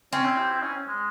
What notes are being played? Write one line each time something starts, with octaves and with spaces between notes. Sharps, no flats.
C4 C#4
E4
G4
E4
C#4
G#3